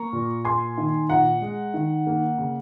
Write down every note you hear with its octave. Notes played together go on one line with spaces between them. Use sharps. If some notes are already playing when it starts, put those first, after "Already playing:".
Already playing: A#3 A#5 C#6
A#2
A#3 G#5 C6
D#3
A#2 F#5 A#5
G#3
D#3
A#3
C#3